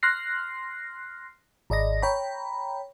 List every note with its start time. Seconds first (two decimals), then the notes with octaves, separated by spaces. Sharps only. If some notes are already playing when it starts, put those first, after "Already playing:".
0.03 C6 F6 F#6 A#6 C7
1.70 G#1 D5 D#5 A#6
2.02 C#5 G5 A#5 B5